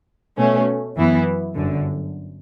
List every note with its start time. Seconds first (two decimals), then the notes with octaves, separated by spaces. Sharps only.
0.37 B2 A3 C#4
0.96 F#2 E3 B3 E4
1.55 G1 F#2 D3